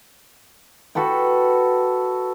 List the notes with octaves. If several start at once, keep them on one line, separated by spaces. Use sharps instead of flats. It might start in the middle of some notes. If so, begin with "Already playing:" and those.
F#4 A4 B4 G5